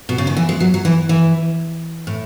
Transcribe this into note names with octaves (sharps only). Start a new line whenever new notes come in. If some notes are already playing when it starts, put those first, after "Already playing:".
B2
C#3
D#3
E3
G#3
F#3
F#3
E3
E3
A2